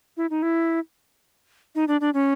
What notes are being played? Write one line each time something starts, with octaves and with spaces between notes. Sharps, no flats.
E4
D#4
E4
D#4
D4
D4
C#4